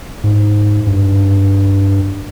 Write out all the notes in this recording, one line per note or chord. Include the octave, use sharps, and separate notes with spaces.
G#2
G2